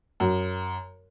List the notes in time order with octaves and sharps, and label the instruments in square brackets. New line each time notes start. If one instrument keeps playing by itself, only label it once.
[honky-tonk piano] F#2